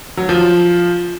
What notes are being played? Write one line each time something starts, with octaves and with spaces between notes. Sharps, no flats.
F#3
F3